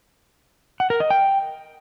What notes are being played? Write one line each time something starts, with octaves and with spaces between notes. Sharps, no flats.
F#5
A#4
D#5
G5